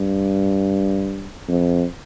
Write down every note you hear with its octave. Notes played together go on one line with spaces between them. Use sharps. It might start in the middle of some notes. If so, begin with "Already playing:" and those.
Already playing: G2
F2